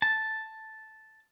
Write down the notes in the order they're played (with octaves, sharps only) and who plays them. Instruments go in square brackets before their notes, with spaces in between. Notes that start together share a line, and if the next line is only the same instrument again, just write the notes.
[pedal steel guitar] A5